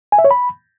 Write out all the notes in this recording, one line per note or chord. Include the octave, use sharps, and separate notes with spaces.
G#5
E5
C#5
B5